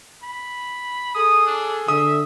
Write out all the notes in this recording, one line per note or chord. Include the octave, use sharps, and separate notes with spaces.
B5
G#4 A4 D#6
D4
D3 E5 D#6